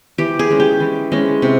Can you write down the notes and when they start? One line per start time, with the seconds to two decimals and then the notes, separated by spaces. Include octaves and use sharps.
0.18 E3 G4
0.39 G#4
0.50 G#3 C#4
0.60 G4
0.80 E3
1.12 G#3 C#4
1.42 C3